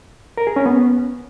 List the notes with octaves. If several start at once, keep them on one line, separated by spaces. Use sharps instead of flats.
A#4
G#4
C#4
B3